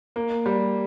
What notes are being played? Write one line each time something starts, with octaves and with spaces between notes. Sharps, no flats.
A#3
G3